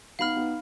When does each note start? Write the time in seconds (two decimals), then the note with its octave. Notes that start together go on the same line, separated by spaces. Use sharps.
0.19 B3 D#4 F5 B5 F6
0.36 B3 D#4